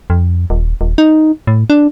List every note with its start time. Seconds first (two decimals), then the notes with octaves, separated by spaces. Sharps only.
0.10 F2
0.50 D#1
0.81 D#1
0.98 D#4
1.47 A2
1.70 D4